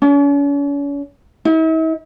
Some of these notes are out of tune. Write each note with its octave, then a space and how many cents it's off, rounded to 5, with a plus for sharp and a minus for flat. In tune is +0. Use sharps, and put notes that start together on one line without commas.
C#4 +40
E4 -45